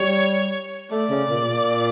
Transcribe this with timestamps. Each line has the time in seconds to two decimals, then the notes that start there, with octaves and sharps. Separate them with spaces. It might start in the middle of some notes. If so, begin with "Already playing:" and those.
Already playing: G3 C#5
0.91 A3 D5
1.10 C#3
1.29 A#2
1.49 A#2